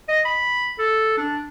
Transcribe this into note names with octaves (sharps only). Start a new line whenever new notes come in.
D#5
B5
A4
D4